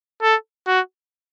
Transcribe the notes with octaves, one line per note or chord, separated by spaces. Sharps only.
A4
F#4